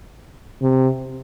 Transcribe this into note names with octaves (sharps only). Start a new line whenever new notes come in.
C3